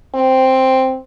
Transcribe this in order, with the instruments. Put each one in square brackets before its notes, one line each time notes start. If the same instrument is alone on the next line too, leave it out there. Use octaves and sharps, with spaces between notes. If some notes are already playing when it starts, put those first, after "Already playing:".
[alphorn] C4